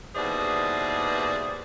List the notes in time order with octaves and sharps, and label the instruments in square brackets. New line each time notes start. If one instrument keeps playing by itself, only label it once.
[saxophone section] D#2 B2 E3 G#4 C5 D5